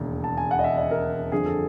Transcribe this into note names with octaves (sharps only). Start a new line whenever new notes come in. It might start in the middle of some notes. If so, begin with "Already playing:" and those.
Already playing: E1 D#2 C#3
A5
G#5
F#5
D#5
E5
D#5
A#4
G1 F2 D3 G#4
A4